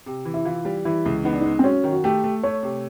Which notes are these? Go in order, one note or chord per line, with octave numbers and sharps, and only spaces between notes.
C3
E3
E4
E3 F4
G3
E3 E4
C#2
B3 D#4
D4
G#3 D#4
C4
F#3 C#4
D#3
F#4
A3 G4
A3
A3 C#5
C3